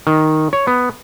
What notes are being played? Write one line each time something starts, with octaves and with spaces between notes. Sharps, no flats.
D#3
C#5
B3